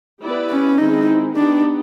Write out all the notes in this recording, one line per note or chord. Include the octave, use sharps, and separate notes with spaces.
B3 E4 G4 B4 D5
C#4
D#3 G#3 C4 D#4 E4 G#4
B3 D4 D#4 G4